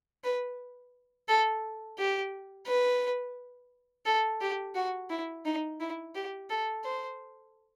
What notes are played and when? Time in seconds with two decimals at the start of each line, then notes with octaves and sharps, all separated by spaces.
0.24 B4
1.29 A4
1.98 G4
2.67 B4
4.06 A4
4.41 G4
4.76 F#4
5.10 E4
5.45 D#4
5.81 E4
6.15 G4
6.50 A4
6.84 C5